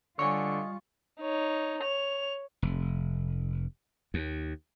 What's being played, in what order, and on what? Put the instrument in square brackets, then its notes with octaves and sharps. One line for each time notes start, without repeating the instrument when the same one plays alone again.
[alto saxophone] D3 [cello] G3 F4 [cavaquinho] C#5 D#5 G#5 [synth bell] C#6
[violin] D#4 C#5
C#5 F7
[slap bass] F1
D#2